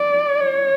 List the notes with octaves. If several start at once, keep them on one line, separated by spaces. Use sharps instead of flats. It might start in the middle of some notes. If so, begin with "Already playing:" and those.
Already playing: D5
C#5